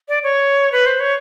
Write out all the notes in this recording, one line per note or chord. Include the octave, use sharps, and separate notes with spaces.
D5
C#5
B4
C5
C#5